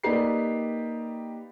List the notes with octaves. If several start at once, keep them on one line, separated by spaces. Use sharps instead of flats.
A#3 D#4 G4 B4 D5 C7